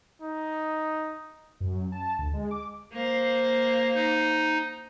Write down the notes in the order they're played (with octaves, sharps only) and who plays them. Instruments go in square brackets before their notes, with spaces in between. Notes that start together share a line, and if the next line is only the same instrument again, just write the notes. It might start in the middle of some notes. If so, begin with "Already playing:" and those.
[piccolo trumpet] D#4
[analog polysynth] F#2
A5
D2
G#3
D6
[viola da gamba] A#3 C5
[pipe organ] D#4